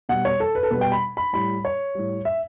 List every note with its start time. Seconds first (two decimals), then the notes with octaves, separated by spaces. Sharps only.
0.09 B2 G3 F#5
0.25 C#5
0.40 A4
0.55 B4
0.63 A4
0.71 B2 G3 B4
0.81 G5
0.92 B5
1.17 B5
1.33 A2 G3 B5
1.65 C#5
1.95 A2 G3
2.25 E5